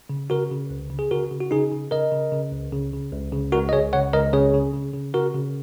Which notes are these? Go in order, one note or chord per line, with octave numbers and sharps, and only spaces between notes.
C#3
C#3 F#4 A#4
C#3
C#2
C#3
G#4
C#3 F#4 A#4
C#3
F#4
C#3 D#4 G#4
C#3
C#3 A#4 D#5
C#3
C#3
C#2
C#3
C#3
C#2
C#3
C#2 F#4 A#4
D#5
C#2 G#4 C#5
C#3 C#5 F#5
C#2 A#4 D#5
C#3 G#4 C#5
C#3
C#3
C#3
C#3 F#4 A#4
C#3